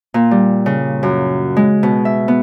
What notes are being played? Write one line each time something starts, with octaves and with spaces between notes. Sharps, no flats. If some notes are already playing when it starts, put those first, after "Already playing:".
A#2
G3
C#3
F#2
G#3
B2
E5
B3